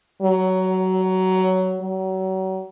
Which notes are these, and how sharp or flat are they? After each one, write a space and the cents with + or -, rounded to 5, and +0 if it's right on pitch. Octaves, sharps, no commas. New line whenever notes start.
F#3 +15
F#3 +35